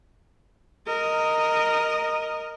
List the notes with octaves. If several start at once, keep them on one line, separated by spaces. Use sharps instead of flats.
A#4 D#5